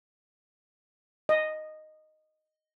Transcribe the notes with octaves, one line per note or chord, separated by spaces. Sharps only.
D#5